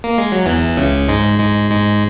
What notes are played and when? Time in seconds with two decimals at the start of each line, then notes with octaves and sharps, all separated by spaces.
0.04 A#3
0.18 G#3
0.32 F#3
0.46 E2 E3
0.77 C#2 C#3
1.08 G#2 G#3
1.39 G#2 G#3
1.70 G#2 G#3